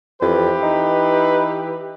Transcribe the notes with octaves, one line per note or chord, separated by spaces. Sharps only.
F2 E3 G4 B4
D#4